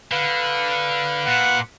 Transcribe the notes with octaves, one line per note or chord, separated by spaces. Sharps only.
D3 B4 F5
A#2 F#5